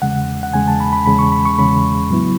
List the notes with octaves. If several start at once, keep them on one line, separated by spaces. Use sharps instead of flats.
E2 C#3 G#3 F#5
F#5
E2 C#3 G#3 G#5
A5
B5
B5
E2 C#3 G#3 B5
C#6
B5
C#6
E2 C#3 G#3 B5
A2 F#3 B3 E4